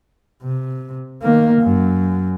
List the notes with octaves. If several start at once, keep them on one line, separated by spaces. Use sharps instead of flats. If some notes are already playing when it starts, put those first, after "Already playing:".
C3
D#3 A#3
F#2